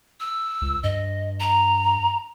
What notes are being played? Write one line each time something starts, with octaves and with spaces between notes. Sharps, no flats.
E6
C#2
G2 D#5
A#5